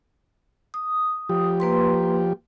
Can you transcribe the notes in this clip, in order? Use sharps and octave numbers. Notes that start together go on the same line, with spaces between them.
D#6
F3 G4
A#3 B4 C6